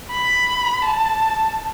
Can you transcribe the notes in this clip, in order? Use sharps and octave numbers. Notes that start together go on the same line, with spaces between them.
B5
A5